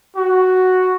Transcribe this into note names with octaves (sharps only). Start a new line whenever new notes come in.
F#4